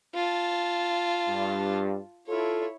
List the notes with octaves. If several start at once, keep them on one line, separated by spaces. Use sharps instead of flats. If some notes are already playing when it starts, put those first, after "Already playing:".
F4 A5
G2
E4 F4 A4 C#5